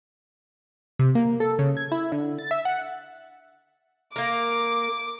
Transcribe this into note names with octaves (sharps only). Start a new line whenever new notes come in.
C3
A#3
A4
C#3
G#6
E4
D3
A6
E5
F#5
A#3 A#4 D6